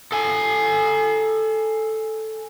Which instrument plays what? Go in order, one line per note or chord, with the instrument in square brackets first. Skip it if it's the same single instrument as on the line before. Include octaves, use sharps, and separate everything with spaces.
[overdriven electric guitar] A4 G#5